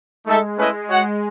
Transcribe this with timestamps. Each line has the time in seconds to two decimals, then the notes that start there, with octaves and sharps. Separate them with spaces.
0.25 G#3 A3 D#4 A4 E5
0.57 A3 C#4 E4 B4 D#5
0.89 F#4 C#5 F#5